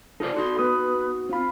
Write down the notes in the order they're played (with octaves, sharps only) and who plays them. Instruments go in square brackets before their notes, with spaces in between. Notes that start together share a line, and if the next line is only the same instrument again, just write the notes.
[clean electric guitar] D#4 F4 C5 [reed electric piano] A4 D5
[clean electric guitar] D#4 F#4 [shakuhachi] C6
[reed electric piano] B3 D#6 [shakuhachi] B4
[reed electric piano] C4 B5 [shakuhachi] F4